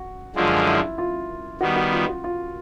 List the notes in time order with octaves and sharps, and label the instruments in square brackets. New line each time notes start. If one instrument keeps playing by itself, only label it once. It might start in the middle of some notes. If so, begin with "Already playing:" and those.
Already playing: [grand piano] F#4
[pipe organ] F#2 D3 F3 G#3 [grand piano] F4
[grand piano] E4
F4
[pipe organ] D#3 G3 B3 [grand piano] F#4
[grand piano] F#4
F4
F#4
F4